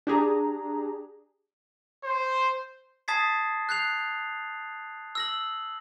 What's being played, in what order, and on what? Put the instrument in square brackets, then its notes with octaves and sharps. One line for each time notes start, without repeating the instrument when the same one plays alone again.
[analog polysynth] D4 G4 G#4 A#5
[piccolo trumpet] C5
[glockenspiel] A5 D#6 G#6 A6 B6 C7
F#6 G6 C7 F7
E6 A#6 F#7